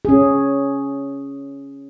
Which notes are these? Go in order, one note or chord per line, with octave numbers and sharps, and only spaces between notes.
C#4 G#4